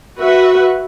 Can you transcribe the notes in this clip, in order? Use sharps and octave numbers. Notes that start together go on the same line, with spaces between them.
F#4 B4 E5 F#5